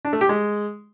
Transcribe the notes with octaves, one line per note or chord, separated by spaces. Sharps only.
D4
A3
G4
G#3